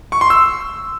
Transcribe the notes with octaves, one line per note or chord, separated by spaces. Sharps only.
C#6
C6
E6